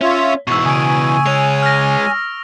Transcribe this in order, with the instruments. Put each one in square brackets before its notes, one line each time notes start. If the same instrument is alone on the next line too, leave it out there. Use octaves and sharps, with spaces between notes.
[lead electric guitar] C#4 [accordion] F4 C#5 E5
[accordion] G#2 [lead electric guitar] B2 E3 [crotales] C#6 E6
[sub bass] C#3 [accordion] G#5 [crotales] D#6 D7
[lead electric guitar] G#3 C#5 [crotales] F7
[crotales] F6 A#6